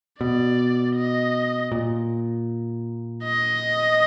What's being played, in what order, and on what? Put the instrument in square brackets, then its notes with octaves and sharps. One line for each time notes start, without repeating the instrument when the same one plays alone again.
[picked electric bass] B2 [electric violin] D5
[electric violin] D#5
[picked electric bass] A#2
[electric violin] D#5